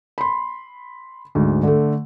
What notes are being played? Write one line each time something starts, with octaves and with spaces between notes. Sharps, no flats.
B5 C6
D2 G#2
D3 A3